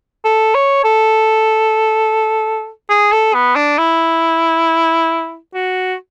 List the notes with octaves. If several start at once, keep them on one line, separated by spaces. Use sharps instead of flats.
A4
C#5
A4
G#4
A4
B3
D4
E4
F#4